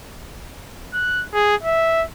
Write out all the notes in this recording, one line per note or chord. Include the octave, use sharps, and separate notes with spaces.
F#6
G#4
E5